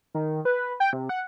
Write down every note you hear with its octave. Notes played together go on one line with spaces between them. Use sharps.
D#3
B4
G5
C3
F#5